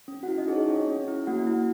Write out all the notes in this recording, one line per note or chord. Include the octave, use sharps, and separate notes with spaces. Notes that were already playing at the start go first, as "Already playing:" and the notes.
C#4
E4 F#4 F#5
D#4 D#5
G#4 C#5
C#4 C#5
C#4
E4
A#3 F#4 F#5
E4